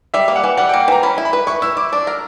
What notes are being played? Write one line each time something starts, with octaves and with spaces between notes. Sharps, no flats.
G3 E5
A#3
F#5
E3
G3 F#5
G5
A#3
G5
E3 A#5
C#4 B5
E4
B5
B4
E4 C#6
E4 E6
E4 D6
D4 D6
A#4